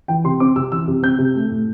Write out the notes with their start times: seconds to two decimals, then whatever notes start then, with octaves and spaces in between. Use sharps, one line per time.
0.08 E3 G5
0.24 C3 C6
0.40 C4 D6
0.56 C3 E6
0.71 E3 E6
0.88 C3
1.03 C4 G6
1.18 C3
1.35 A3
1.50 A2